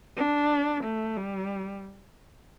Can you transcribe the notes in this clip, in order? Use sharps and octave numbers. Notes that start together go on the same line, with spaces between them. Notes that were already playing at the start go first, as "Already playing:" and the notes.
D4
A3
G3